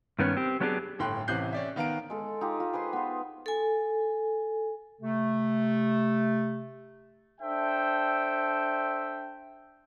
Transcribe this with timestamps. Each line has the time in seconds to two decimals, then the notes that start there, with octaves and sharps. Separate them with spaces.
0.19 G2 D#3 B3 C#4
0.37 C4 G4
0.60 F#3 B3 C#4 D4 G4 G#4
0.99 G1 A2 G5 C6 F#6
1.28 A1 C3 E3 F#6 G6 C7
1.53 C#4 D5 E5
1.76 D#3 B3 F5 A#5 D7
2.10 G#3 A4
2.41 D#4 F4 G4
2.60 F4
2.73 G#4 B4 C5 C6
2.93 B3 F4
3.46 A4 G#5
5.01 C3 A3
7.41 D4 A4 C5 E5 G5